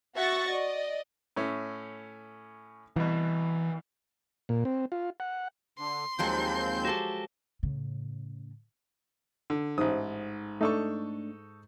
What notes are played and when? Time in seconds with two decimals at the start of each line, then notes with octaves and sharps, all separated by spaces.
0.15 F#4 E5 F#5 C#6 A6 A#6
0.48 D5 D#5
1.37 A2 C#4 E5
2.96 C2 B2 E3
4.49 A#2
4.65 C4
4.92 F4
5.20 F#5
5.79 D3 C6
6.19 D#2 F3 F#3 G#3 C4 G6
6.85 F#4 G4 A4
7.63 A2 C#3
9.50 D3
9.78 A1 G#2 D#6
10.61 A3 D4 D#4 A4 C#6